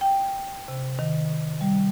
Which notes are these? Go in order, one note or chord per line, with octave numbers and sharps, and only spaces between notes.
G5
C3
D#3
G3